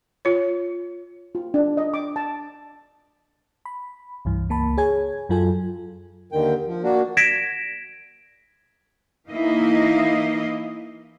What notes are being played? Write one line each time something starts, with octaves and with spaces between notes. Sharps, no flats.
F4 C#5
F4
D4
D#5
D6
A5
B5
C2 G2 E3
C#2 A#3 A5 B5
G#4 C#5 G#5 G#6
F#2 F#3 F4 A4 G#5
D#2 D3 D#3 G5
F3
A#3 D4 F#4
G#6 A#6 B6 D7 E7
E3 A#3 D#4 E4 D#5 F5